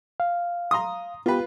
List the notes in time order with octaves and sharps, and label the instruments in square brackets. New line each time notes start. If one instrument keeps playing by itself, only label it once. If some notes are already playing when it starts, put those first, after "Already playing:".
[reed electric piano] F5
[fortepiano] A#5 C6 D#6
[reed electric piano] B3 G4 [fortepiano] F4 B4